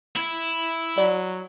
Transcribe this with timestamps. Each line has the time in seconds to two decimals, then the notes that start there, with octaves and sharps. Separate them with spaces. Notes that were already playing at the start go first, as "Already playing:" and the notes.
0.16 E4
0.98 F#3 D5